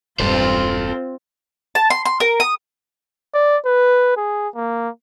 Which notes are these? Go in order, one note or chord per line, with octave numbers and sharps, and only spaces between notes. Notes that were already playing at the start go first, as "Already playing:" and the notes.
E1 G2 C4 F4 A4 C5
A5
C6
C6
A#4
D#6
D5
B4
G#4
A#3